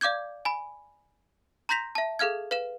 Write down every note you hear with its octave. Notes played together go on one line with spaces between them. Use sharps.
D5 F5 D6 G6 G#6
G#5 B5
A#5 C6 G6 A#6 B6 F7
E5 A5
G#4 A4 F5 F6 G#6
B4 F5 E7